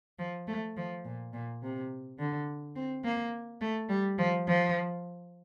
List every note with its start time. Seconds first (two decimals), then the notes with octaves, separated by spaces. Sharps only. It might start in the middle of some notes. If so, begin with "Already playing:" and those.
0.19 F3
0.48 A3
0.77 F3
1.05 A#2
1.33 A#2
1.62 C3
2.19 D3
2.76 C4
3.04 A#3
3.61 A3
3.89 G3
4.18 F3
4.47 F3